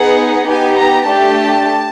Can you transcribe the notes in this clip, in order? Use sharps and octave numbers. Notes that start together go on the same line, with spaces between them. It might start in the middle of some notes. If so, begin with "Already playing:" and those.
Already playing: B3 D#4 G#4 F#5
B3 D#4 G4 G#5
A#5
A3 D4 G4 A5